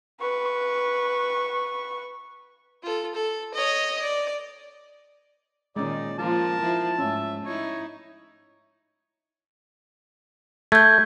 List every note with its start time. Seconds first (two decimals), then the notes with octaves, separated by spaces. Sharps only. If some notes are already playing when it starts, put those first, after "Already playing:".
0.20 B4 C#6
2.83 F4 A4
3.14 A4
3.54 C#5 D#5
4.02 D5
5.76 A#2 D#3 G#3 C#4 D#4 D5
6.19 F3 A#3 F4 A#4 A5
6.60 F3 E4
6.99 G#2 A3 C#4 E5
7.45 D#4 E4 C#5
10.72 A3 G6 G#6